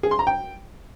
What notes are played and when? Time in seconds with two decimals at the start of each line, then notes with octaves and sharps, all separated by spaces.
0.03 G#4
0.11 C6
0.19 A#5
0.27 G5